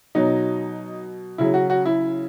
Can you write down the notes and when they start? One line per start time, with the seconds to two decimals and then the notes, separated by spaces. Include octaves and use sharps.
0.15 B2 F#3 D#4
1.38 C#3 F#3 E4
1.54 F#4
1.70 F#4
1.85 E4